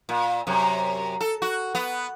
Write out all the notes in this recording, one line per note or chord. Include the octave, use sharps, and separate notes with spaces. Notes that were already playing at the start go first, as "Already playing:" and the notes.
A#2
F#2 C3
A4
F#4
B3